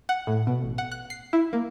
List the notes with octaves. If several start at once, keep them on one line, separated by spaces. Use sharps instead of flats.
F#5
A2
B2
A1
F#5
F#6
C7
E4
A#3